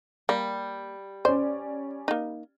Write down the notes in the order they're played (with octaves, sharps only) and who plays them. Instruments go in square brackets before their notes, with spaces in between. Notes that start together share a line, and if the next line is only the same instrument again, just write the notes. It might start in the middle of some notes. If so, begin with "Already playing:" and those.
[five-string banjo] G3 [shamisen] A#3
[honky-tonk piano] C#4 D5 [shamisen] C5
[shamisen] A#3 D#4